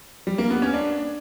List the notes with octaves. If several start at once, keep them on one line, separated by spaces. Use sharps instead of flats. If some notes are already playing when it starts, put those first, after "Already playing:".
G3
A#3
B3
C#4
D4